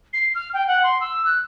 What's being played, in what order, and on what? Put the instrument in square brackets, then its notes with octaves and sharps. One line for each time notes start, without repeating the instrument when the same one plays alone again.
[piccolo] C7
F6
G5
F#5
C6
E6
F#6